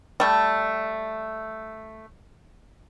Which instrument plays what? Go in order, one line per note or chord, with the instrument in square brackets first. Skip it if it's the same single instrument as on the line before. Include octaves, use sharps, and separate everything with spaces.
[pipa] G3 A3